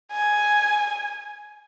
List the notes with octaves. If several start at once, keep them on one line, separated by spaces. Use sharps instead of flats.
G#5